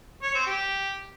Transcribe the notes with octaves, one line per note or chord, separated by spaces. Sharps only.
C#5
C4
G4